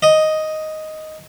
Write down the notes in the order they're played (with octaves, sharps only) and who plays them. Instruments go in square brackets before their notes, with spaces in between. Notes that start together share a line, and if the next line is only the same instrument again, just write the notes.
[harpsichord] D#5